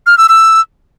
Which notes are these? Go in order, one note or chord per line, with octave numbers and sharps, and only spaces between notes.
F6
E6
E6